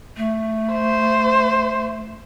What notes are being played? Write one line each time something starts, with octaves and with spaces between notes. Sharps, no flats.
A3
C5